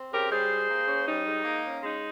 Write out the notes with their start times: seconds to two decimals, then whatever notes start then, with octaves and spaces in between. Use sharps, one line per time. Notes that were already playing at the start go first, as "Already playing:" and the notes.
Already playing: C4
0.11 C#3 G4 A#4
0.31 G3 G#4 C5
0.49 G#2
0.68 A#3
0.87 C#4
1.06 G3 D#4
1.25 G#2
1.44 A#3
1.64 C#4
1.82 G#3 D#4